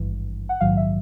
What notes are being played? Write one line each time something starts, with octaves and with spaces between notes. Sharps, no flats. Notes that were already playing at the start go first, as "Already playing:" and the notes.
Already playing: G#1 G2 E3
F#5
A#1 G#2 D#3 F#3 F5
E5